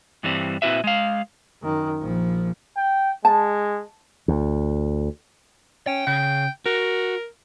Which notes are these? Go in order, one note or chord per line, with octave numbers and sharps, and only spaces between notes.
G2 E3 G3 C4
A#2 C4 E4 F#4 B4 E5
G#3 F5
F#2 D#3
A#1 F3
G5
G#3 A5
D2
C#4 G5
C#3 G5
F#4 A#4